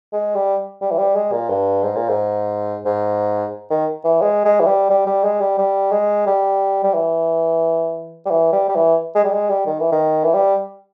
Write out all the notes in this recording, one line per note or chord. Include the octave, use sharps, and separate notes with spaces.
G#3
G3
G3
E3
G3
G#3
A#2
G2
G#2
A#2
G#2
G#2
D#3
E3
G#3
G#3
E3
G3
G3
G3
G#3
G3
G3
G#3
G3
G3
E3
G3
E3
G3
G3
E3
G#3
G3
G#3
G3
D#3
E3
D#3
E3
G3